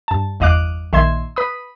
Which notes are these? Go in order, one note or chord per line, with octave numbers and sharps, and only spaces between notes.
G2 A5
G1 E2 D#5 F5 D6 F#6
A#1 D#3 E5 C6 G#6
B4 B5 D#6